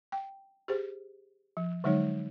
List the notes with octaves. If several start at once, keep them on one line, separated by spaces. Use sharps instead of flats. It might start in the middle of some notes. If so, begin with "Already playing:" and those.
G5
G4 G#4 C5
F3
D3 F#3 G#3 D#4 C#5